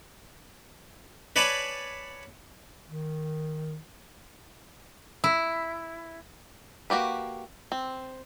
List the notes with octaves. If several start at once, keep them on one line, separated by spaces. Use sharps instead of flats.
B4 C#5 D5 G#5 A5 B5
D#3
E4
A#3 F#4 G4 B4
C4